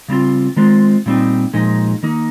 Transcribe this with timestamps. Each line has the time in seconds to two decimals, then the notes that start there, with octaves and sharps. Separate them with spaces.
0.08 C#3 G3 C4 F4
0.56 D#3 G#3 C4 F4
1.06 A#2 G3 C4 D#4
1.54 A#2 F3 G#3 D#4
2.03 D#3 A#3 D#4